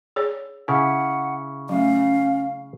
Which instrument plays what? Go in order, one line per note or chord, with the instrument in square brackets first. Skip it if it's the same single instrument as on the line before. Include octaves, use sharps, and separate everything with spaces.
[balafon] G#4 C#5 D5
[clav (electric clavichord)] C#3 E4 [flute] F#5 [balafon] G#5
[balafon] F#3 A3 [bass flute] C#4 [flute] F5